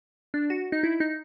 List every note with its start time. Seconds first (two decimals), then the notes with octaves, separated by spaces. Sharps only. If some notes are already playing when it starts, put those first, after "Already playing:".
0.34 D4
0.50 F#4
0.72 D#4
0.83 E4
1.00 D#4